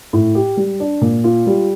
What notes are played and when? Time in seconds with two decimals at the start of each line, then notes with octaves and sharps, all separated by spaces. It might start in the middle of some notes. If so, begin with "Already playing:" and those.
0.13 A2
0.35 G4
0.57 G3
0.80 D4
1.01 A#2
1.24 F4
1.46 G3